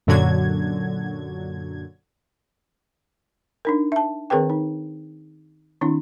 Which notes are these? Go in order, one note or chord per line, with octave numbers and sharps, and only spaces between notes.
F#2 A#2 D3 F#3 F#4 G#6
D4 D#4 A#4
E5 A5
D#3 C4 G#4 A#4 B4 G5
D#4
D#3 C4 D4 E4